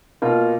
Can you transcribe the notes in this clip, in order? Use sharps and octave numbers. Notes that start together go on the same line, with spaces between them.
B2 A#3 F4